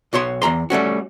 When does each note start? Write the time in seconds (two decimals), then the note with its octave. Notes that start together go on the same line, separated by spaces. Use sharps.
0.13 B1 F#4 C#5 C6
0.42 E2 G#2 A#5 C6
0.70 G3 A3 C#4 F#4